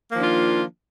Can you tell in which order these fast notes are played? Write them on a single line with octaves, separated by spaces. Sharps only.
A#3 F3 D#3 D4 F4